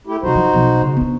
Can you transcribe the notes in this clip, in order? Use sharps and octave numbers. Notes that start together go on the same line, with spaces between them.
A3 E4 G4
C3 F3 D#4 F#4 C5
F3
B1
C#3
B3 D4